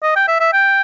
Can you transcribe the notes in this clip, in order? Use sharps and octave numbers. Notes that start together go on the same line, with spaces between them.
D#5
G5
E5
E5
G5